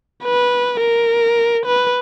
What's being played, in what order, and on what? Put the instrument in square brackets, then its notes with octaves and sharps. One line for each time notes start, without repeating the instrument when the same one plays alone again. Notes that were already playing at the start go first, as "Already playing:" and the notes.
[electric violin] B4
A#4
B4